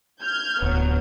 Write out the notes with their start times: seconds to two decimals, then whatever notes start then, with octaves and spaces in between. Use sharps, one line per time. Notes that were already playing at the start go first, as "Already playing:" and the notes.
0.21 F6 G6 G#6
0.62 D1 F#3 B3